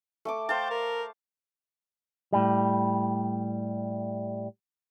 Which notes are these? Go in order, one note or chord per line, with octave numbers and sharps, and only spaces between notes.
A3 A5 D6
C5 F5 G5 A5
A#4
A2 G3